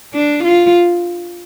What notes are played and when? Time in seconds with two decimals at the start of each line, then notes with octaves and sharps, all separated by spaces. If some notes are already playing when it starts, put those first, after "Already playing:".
0.14 D4
0.44 F4